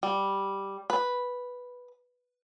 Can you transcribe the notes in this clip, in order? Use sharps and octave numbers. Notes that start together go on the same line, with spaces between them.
G3
B4